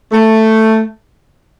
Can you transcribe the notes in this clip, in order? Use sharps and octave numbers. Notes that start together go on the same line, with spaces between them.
A3